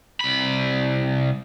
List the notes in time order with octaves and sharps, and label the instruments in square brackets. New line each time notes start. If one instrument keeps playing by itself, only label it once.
[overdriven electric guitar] C2 B5